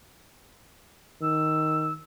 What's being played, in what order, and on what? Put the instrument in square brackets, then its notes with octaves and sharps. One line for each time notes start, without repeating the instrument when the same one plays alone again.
[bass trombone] D#3 [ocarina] E6